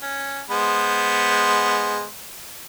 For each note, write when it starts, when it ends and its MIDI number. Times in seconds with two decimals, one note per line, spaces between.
0.02 0.40 61
0.50 2.04 56
0.50 2.04 59
0.50 2.04 72